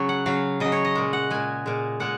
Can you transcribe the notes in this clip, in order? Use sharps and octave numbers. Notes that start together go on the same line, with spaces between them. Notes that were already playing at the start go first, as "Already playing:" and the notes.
Already playing: C#3 F#3 C#5
F#5
C#3 F#3 F5
C#3 F#3 D#5
C#5
D#5
A#2 G#3
F#5
A#2 G#3 G#5
A#2 G#3
A#2 G#3 F#5